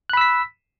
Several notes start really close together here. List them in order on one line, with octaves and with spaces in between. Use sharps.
F#6 B5 E6 B6